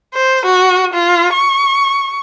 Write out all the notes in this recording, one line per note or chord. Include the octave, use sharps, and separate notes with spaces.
C5
F#4
F4
C#6